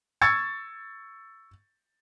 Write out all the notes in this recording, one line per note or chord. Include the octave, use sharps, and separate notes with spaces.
C#6 E6 G#6 A6 C#7